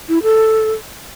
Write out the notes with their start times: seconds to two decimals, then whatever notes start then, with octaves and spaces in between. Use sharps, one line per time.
0.09 E4
0.23 A4